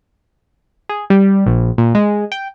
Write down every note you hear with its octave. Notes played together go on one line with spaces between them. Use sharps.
G#4
G3
A#1
A#2
G#3
G5